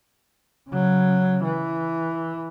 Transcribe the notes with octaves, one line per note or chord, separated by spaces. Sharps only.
C#3 F#3
E3